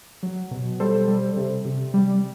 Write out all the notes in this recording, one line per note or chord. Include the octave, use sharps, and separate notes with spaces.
F#3
B2
G3 A4 C5
G3
C3
C3
G3